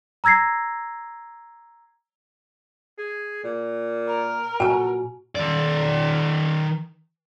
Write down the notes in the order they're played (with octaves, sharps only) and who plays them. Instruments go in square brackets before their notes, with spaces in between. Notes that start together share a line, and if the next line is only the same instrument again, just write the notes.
[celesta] A#5 E6 G#6 A#6 C7
[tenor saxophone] G#4
A#2
[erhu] A#4
[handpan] A#2 F#4 [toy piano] G#5 A5
[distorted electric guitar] D#3 D5